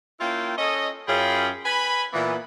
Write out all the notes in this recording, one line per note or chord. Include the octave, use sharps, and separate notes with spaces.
A#3 C#4 E4 F4 G5
C#4 A4 C#5 D#5
F#2 C#4 F4 G#4 G5 B5
B4 G#5 B5
A#2 E3 B3